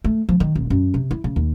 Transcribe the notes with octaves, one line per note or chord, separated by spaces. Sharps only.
A3
F3
D#3
D#1
F#2
C3
E4
C#3
D#2